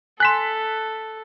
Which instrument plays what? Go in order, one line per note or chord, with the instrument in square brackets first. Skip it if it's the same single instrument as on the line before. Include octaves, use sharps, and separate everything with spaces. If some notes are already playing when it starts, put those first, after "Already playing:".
[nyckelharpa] A4 [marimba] G#5 C6 [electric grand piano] F#6 B6 E7